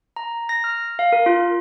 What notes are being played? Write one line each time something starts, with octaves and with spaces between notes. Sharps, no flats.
A#5
A#6
F6
F5
A#4
F4